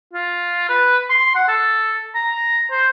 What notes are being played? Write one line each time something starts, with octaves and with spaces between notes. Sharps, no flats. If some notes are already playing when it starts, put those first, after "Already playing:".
F4
B4
C6
F#5
A4
A#5
C5